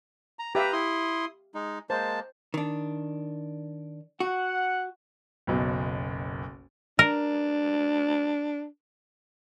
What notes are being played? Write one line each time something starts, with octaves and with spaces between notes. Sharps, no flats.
A#5
G4 B4 E5 F5 A#5
E4 C6 D#6
G#3 D#4
G#3 A#3 C5 A5
D#3 D4
F#4 F#5
F#1 B1 B2
D4 A#4